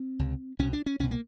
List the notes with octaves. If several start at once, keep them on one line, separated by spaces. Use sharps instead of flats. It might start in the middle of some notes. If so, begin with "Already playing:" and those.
Already playing: C4
C#2 C3
C2 B2 C#4
D4
C#4
C2 B2 C#4
A#3